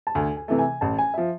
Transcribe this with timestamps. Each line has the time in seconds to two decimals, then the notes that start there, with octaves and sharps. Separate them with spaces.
0.07 A5
0.15 D2 G#5
0.37 G#5
0.48 C3 E3 A3
0.59 G#5
0.81 A1 A5
0.98 G#5
1.14 F3 E5